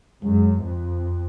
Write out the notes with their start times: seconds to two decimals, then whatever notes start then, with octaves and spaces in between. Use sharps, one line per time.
0.23 F#2 G#3
0.62 F2